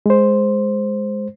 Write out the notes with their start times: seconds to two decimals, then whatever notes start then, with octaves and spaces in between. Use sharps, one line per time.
0.06 G#3 C5